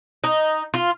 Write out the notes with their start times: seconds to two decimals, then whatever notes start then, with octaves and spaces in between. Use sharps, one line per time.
0.24 D#4
0.74 F4